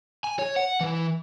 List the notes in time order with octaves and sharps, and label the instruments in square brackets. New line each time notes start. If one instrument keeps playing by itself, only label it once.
[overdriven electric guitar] G#5
C#5
F#5
E3